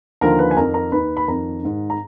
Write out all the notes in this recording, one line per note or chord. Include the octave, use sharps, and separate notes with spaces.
D#2 D3 F3 A#4 A#5
B4 B5
G#5
F2 D#3 A#4 A#5
A#4 A#5
D#2 D#3 B4 B5
B5
F2 D#3 A#4 A#5
G#2 D#3
A#5